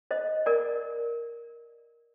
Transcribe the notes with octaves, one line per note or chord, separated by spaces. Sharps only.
C5 D#5
A#4 D5